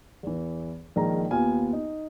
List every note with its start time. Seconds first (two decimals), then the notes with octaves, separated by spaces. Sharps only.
0.23 E2 E3
0.96 A#1 D#3 G#3 A#5
1.31 D#2 B3 F4 G#5 F6
1.73 D#4